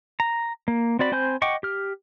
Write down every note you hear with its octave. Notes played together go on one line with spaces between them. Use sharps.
A#5
A#3
C4 F#4 D5 B5
C4 C5 G#5 B5 G6
D#5 F#5 G5 C#6 D6
G4 F6